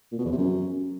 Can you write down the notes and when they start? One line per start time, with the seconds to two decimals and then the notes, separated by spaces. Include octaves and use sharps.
0.12 A#2
0.19 B2
0.25 E2
0.32 C3
0.38 F#2